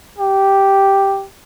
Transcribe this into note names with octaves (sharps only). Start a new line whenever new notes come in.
G4